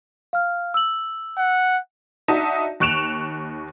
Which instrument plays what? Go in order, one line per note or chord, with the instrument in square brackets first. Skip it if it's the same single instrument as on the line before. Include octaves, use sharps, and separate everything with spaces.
[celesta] F5 F6
E6 F#7
[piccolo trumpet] F#5
[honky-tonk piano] D4 D#4 F#4 E5 A5
D#2 C#6 F#6 D7 E7 F7